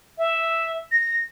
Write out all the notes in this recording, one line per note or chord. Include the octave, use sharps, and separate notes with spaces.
E5
A#6